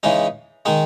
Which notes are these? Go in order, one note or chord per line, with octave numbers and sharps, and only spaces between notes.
C#3 E3 G#3 D#4
D#3 G#3 D#4